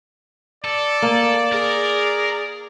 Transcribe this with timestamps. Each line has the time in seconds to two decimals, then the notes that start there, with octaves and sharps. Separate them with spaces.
0.64 A4 D5
1.02 A#3
1.52 G#4 A#4